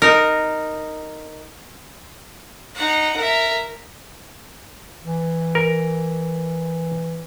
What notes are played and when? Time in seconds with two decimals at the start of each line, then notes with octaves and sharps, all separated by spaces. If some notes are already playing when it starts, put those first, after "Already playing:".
0.02 D#4 A#4
2.75 D#4 F#5
3.16 A#4 E5
5.04 E3
5.55 A#4